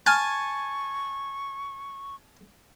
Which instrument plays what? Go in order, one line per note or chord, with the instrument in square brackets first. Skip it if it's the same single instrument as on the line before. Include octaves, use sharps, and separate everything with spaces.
[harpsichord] G#5 A5 [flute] C#6 [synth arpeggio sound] F6